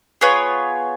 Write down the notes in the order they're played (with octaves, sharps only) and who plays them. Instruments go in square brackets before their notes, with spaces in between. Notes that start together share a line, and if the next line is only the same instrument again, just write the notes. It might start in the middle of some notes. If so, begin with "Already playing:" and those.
[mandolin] B3 F4 G#4 C#5